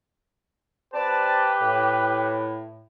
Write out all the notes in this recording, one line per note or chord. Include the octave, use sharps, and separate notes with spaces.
C4 G4 B4 D5 A5
A2